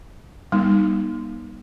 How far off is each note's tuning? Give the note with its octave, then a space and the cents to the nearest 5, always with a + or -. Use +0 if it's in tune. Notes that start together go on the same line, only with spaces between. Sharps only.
G3 +0 B3 -45 D#4 +0